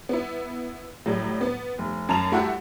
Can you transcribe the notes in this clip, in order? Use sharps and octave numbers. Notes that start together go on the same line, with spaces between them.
B3 E4
A2 F#3 G3
B3
F1
F#2 A5 A#5 F7
A3 E4 F#4 G4 E5 F#5